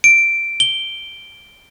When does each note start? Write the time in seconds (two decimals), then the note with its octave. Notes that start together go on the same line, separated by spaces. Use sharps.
0.04 D7
0.60 G7